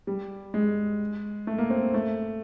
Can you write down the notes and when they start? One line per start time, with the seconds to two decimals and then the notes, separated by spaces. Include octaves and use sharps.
0.07 G3
0.54 G#3
1.47 A3
1.58 A#3
1.70 C4
1.94 A3